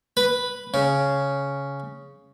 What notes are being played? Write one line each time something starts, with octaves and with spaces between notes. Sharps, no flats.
B4
C#3